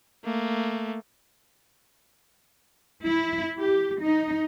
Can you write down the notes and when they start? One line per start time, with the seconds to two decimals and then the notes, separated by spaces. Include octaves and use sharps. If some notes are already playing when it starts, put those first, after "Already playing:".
0.24 A3 A#3
3.06 E4
3.61 G4
4.03 D#4